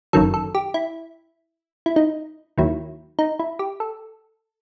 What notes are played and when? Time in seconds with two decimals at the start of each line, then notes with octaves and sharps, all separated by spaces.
0.13 G1 F#2 D#3 F#3 A4
0.34 A4
0.55 G4
0.74 E4
1.86 E4
1.96 D#4
2.58 D#2 D#3 F#3 E4
3.19 D#4
3.39 E4
3.59 G4
3.80 A4